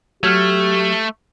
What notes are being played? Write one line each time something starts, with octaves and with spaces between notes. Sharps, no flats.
F#3 A3 G4 F6 G6 G#6